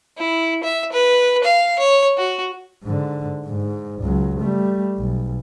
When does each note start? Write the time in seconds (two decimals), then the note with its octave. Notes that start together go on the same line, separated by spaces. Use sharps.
0.17 E4
0.63 E5
0.92 B4
1.44 F5
1.79 C#5
2.17 F#4
2.84 G#2 D3
3.46 G#2
4.03 C#2 F#3
4.40 G3 A3
4.98 B1